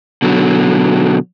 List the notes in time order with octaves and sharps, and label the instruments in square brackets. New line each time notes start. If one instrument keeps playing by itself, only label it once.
[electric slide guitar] B2 D3 F#3